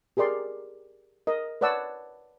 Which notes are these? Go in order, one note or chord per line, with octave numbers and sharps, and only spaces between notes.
G4 G#4 A#4 D5 C6
A#4 D#5
B4 C#5 D5 F#5 A5 E6